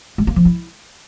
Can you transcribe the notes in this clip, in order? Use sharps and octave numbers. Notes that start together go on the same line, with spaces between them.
G#3
A#3
F3
E4